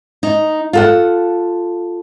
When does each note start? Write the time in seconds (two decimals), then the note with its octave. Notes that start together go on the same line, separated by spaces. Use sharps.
0.23 D#4
0.73 F4 A4 F#5